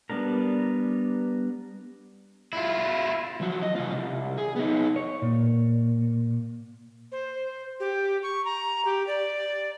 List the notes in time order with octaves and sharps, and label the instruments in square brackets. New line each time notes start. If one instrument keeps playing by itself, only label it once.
[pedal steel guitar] G3 B3 D4 A#4
[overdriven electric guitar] E4 F4
F3 F#3
D#5
C3 F4
C2
G#4
B3 D#4
[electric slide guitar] C#5
A#2
[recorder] C5
G4
C#6
A#5
G4
D5